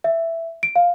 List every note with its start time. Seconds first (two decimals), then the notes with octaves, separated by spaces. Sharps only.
0.04 E5
0.63 D7
0.76 F5